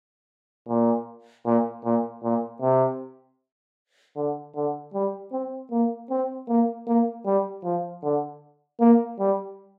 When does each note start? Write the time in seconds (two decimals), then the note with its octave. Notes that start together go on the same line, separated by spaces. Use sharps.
0.68 A#2
1.46 A#2
1.84 A#2
2.23 A#2
2.62 C3
4.16 D3
4.55 D3
4.94 G3
5.32 C4
5.71 A#3
6.10 C4
6.49 A#3
6.87 A#3
7.26 G3
7.64 F3
8.03 D3
8.80 A#3
9.19 G3